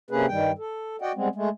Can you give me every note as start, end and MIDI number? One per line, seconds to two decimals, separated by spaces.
0.11 0.26 48
0.11 0.26 58
0.11 0.26 61
0.11 0.26 68
0.11 0.26 71
0.28 0.51 43
0.28 0.51 51
0.28 0.51 55
0.28 0.51 79
0.58 0.96 69
1.02 1.12 66
1.02 1.12 74
1.02 1.12 75
1.02 1.12 78
1.02 1.12 79
1.15 1.28 55
1.15 1.28 56
1.15 1.28 59
1.15 1.28 60
1.36 1.49 56
1.36 1.49 57